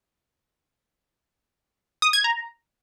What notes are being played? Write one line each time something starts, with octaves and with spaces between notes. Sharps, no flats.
D#6
G#6
A#5